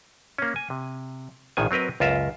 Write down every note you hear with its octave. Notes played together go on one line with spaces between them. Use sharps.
A#3 C#4
G#5
C3
A#1 A2 D#3 G#5
F#3 C4 A#4 B4 D#5
C#2 F#2 F4 A#4 E5 A5